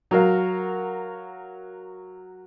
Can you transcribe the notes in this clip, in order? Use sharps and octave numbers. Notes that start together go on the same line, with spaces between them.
F#3 F#4 A#4 F5